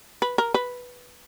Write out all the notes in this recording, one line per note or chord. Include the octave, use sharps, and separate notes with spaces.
B4
A#4
B4